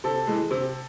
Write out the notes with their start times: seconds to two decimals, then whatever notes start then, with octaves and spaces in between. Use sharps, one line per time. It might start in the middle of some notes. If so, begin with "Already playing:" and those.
0.04 C3 A4
0.27 E3 G#3
0.51 C3